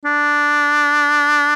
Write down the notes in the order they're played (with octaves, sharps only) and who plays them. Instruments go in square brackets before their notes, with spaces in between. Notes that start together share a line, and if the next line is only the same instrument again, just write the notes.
[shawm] D4